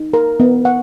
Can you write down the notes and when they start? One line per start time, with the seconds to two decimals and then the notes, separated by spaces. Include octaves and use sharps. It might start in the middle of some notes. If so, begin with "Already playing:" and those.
Already playing: D#4
0.14 A#4
0.40 B3
0.65 F#5